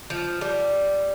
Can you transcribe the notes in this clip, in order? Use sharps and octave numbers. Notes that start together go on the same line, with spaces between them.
F3
G3